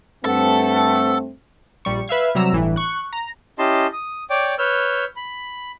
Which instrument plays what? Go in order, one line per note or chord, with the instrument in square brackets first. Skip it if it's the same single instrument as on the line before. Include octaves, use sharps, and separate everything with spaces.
[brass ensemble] G2 A3 C4 [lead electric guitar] A4 [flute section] B4 F#5 A5
[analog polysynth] A#1 G3 C#6
B4 E5 F5 G#6
C3 F#3 G3 A#5 E6
G1 A2 E3
C#6 F#6
A#5
[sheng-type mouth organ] C#4 E4 G4 D#5 A5 C6
D#6
C#5 D5 G5 D6
B4 C#5 E6 F6 G6
B5